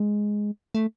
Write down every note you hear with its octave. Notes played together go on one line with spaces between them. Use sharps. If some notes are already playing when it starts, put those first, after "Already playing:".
Already playing: G#3
A3